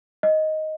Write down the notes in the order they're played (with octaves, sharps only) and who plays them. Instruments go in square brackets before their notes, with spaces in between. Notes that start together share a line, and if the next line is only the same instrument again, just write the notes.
[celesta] D#5